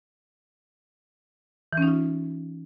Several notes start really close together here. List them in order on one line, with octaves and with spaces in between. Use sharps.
E3 C#4 D#4 F4